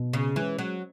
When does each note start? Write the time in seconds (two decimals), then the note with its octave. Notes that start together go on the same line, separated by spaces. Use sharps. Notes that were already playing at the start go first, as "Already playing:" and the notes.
Already playing: B2
0.13 C#3
0.36 E3 G#3 C#4
0.59 F#3